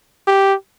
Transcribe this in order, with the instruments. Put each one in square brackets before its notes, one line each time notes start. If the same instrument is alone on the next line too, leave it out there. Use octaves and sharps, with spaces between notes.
[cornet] G4